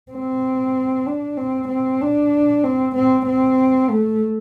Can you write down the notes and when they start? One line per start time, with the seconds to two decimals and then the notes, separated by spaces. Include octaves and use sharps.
0.11 C4
1.06 D4
1.37 C4
1.68 C4
2.01 D4
2.64 C4
2.95 C4
3.26 C4
3.89 A3